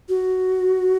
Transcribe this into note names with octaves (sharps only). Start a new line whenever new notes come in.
F#4